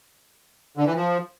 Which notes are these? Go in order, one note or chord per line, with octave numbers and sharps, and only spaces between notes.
D3
E3
F3